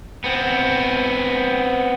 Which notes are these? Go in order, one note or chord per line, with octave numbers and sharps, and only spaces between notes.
B3 C4